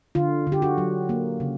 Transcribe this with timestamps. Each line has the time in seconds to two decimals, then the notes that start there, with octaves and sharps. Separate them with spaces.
0.15 D3 F4
0.47 D3
0.52 G4
0.62 F#4
0.78 F#3
1.09 A#3
1.40 C#3